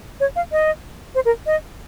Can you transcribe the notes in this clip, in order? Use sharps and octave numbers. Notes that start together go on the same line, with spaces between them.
C#5
F5
D#5
C5
A#4
D#5